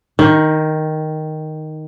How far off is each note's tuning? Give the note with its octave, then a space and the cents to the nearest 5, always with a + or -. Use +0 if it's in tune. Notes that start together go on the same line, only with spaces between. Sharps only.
D#3 +0 D#4 +35